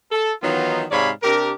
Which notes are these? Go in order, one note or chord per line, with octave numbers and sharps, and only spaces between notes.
A4
D#3 E3 F#3 B3 D#4 F4
G#2 C3 C#5 D5 F5 B5
C3 D4 G4 A#4